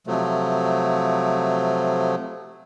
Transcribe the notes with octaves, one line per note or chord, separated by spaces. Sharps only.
C3 F3 F#3 A3